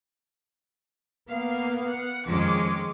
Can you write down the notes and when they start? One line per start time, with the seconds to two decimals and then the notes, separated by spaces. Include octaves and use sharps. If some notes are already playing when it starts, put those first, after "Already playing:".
1.29 A#3 B3 F5
1.89 F#5
2.26 F2 D#3 G#3 C#4 D6